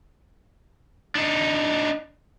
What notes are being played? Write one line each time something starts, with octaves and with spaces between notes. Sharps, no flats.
D4 D#4